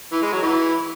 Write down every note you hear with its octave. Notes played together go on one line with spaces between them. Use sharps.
E3
G#3
F#3
E3